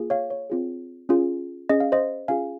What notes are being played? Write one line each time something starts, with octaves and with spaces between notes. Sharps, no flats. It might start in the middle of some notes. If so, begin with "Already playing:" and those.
Already playing: A#3 F4 G#4
C#5 F5
C#5
C4 F4 G#4
C#4 F4 G#4
C#4 G#4 D#5
F5
C5 D#5
C#4 F4 G#4 F5 G#5